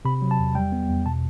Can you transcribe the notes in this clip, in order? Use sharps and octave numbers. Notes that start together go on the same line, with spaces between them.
C3 B5
F#3
A5
E2
G3 G5
B3
E2
B2 A5